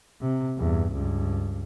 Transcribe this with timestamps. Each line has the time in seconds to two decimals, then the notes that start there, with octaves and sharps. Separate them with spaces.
0.22 C3
0.58 E2 G2
0.93 C#2 G2